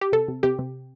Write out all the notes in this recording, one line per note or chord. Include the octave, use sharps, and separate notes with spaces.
G4
C3 A4
C3
C3 G4
C3